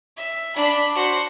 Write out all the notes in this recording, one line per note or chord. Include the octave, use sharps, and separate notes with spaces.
E5
D4 B5
F#4 C5